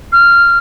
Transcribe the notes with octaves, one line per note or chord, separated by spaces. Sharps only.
F6